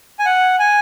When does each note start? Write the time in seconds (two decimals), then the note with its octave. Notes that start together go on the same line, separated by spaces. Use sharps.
0.19 G#5
0.25 F#5
0.59 G#5